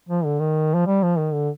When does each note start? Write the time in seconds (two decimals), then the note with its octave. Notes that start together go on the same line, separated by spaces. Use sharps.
0.09 F3
0.25 D3
0.40 D#3
0.75 F3
0.87 G3
1.03 F3
1.18 D#3
1.33 D3